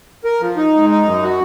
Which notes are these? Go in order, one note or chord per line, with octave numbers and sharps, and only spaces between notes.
A#4
F3
D#4
G#2
D#4
F#2
F#4